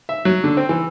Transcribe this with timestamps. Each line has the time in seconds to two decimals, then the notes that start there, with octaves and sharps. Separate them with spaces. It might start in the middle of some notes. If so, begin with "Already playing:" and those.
0.09 E5
0.25 F#3
0.44 D3
0.57 C4
0.69 E3